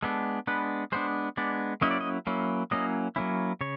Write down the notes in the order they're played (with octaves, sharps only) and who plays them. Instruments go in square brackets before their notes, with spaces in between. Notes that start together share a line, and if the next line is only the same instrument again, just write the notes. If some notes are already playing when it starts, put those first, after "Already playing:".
[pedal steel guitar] G#3 B3 D4 A4
G#3 B3 D4 B4
G#3 B3 D4 C5
G#3 B3 D4 D5
F#3 A#3 C#4 E4 D#5
D5
D#5
F#3 A#3 C#4 E4
F#3 A#3 C#4 E4 D#5
F#3 A#3 C#4 E4
C#3 C#5